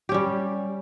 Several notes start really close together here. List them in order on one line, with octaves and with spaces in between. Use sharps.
G4 C#4 G3